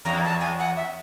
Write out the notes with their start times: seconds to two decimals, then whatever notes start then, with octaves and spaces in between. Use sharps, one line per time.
0.05 E2 A#5
0.24 A5
0.41 G#5
0.58 F#5
0.77 E5